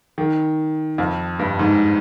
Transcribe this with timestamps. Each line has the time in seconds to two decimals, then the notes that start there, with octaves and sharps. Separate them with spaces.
0.18 D#3
0.98 F2
1.39 G2
1.59 G#2